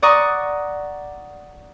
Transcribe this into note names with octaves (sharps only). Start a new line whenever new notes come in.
D5 F#5 A#5 C#6 D#6